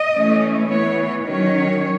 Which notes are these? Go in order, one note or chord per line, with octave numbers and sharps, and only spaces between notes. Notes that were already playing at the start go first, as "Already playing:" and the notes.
Already playing: D#5
E3 A3 C#4
E3 B3 C#5
D#3 F#3 C#4 C#5